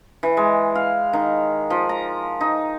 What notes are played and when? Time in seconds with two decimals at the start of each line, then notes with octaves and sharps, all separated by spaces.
0.23 E3
0.37 G#3
0.75 F5
1.13 D#3
1.70 F3
1.89 A#5
2.41 D#4